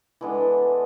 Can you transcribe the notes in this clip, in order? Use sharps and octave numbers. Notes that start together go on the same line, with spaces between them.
E3 G#3 B3 D4 A4